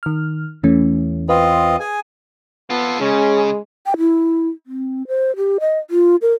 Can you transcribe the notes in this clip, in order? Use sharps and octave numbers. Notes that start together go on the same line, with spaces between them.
D#3 F6
E2 E3 A3 C#4
C4 F4 B4 D#5
G#4 G#5
B3 F4 A4
C#3 G#3 C#4
G5
E4
C4
C5
G4
D#5
F4
A#4